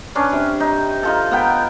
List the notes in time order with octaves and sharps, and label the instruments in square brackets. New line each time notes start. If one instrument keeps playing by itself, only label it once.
[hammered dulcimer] C#4 D4 B4
C3
D#4
D#4 F4 A4
B3 A#4 G5